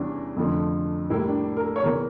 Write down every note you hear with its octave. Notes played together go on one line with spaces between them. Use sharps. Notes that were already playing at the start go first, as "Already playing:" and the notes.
Already playing: E2 E3 G3 C#4 D4 E4
F2 D3 F3 A3
A2 G3 A#3 E4
D4
A#4
A4
C#5
E2 E3 A#3 A#4